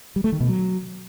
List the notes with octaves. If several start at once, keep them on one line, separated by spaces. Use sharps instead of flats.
G3
A3
D#3
B2
F#3